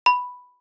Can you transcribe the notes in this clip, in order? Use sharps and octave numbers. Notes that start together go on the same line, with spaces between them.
B5